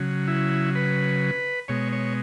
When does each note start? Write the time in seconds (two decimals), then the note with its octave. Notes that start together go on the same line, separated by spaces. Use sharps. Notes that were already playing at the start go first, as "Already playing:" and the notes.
Already playing: C#3 F#3
0.28 E4
0.75 B4
1.68 B2 G#3 C#5
1.93 C#5